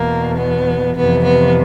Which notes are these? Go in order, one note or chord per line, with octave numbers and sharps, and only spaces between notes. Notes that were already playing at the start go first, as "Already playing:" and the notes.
Already playing: E2 B2 A#3
B3
F2 C3 E3 B3
B3